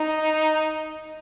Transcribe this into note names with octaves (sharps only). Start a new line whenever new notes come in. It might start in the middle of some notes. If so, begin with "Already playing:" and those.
Already playing: D#4